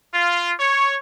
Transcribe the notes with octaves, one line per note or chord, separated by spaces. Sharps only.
F4
C#5